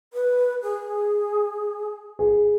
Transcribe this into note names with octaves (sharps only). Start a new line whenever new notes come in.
B4
G#4
G#4